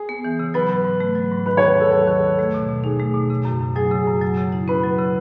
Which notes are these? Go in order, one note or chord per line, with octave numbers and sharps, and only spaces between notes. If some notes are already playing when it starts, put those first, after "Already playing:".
Already playing: G#4
B3
E3
C#3
F#3 B4
G#2
G#2
A3
F#3
G#2
D#3 B4
D#2 C#5
D#2 A4
F#3 A4
D#3
D#2
A3
B2
B2
D#4 G#4
A3
B2
C#3
F#2
F#2
F#3 G#4
C#3
F#2
F#3
C#3
E4
C#4 B4
F#3
C#3